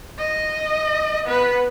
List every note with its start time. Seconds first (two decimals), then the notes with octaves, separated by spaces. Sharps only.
0.18 D#5
1.25 B3 B4